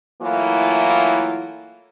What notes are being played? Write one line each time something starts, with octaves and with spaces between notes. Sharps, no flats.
E3 F#3 A3 A#3 E4 F4